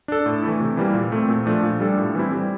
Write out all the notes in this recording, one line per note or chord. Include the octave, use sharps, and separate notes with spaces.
D4 A4
A2
E3 A3 E4
C3
E3 G3 A#3
A#2
A3 C4
A#2
F3 A3 D4
A#2
G3 D4 A4
A2
E3 G3 C4 E4
G3